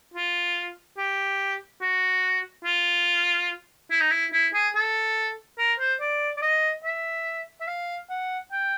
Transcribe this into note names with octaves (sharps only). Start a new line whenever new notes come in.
F4
G4
F#4
F4
E4
D#4
E4
E4
G#4
A4
A#4
C5
D5
D5
D#5
E5
E5
F5
F#5
G5